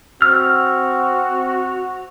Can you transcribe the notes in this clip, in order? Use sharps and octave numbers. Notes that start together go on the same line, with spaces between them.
C4 F#4 E6 F6